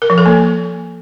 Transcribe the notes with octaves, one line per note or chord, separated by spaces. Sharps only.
A#4
F3
A4
A#3